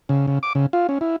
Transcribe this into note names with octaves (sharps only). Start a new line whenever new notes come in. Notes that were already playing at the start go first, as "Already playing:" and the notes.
C#3
C#3
D6
C#3
F4
C#4
E4